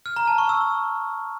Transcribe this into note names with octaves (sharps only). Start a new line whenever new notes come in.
F6
A#5
A5
C#6
E6